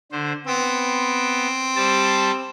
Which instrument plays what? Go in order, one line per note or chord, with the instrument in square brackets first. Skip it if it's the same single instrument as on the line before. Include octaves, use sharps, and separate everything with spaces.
[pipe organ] D3 C5
[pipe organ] B3 [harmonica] C4
[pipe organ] G3 C5 A5